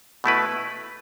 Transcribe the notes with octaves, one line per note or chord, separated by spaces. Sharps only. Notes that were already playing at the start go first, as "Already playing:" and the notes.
B2 A3 E4 B4